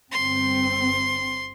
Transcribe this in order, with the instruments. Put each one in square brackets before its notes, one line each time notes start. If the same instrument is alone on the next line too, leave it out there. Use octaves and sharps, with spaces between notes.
[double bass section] G1 C4 [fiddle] C6